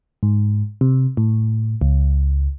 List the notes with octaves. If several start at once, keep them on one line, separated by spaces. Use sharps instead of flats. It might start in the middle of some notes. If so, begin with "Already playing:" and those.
G#2
C3
A2
C#2